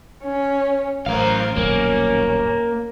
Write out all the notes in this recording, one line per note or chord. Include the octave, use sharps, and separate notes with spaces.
C#4
A1 F#2 A#4 C5 F5
D#1 B1 F#2 A#3 C#4